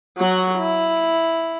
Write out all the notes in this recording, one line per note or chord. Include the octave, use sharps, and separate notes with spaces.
F#3 F#4
E4